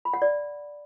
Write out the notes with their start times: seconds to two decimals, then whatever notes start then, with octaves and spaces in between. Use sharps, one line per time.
0.05 B5
0.14 F#5
0.22 D5